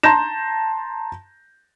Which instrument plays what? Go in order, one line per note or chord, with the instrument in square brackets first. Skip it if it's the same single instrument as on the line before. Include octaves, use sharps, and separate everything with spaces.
[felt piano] A5 A#5 C6 G6 A#6 E7